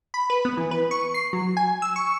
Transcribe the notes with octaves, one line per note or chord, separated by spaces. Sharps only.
B5
B4
B3
E3
B4
C#6
C7
F#3
G#5
E6
C#6